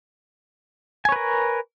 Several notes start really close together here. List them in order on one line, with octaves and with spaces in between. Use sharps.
G#5 C#5 B4 A#4